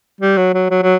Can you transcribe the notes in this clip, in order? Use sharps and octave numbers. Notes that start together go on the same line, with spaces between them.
G3
F#3
F#3
F#3
F#3